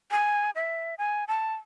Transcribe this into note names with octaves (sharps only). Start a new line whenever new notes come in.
G#5
E5
G#5
A5